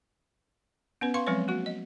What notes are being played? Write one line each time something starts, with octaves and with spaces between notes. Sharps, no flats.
B3 C#4 B4
B4 F5 C6 C#6
F3 F#3 G#3 C4 B4 C#5
A#3 F#4
D#5